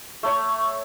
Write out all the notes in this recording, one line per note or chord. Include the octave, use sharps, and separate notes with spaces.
A3 C#5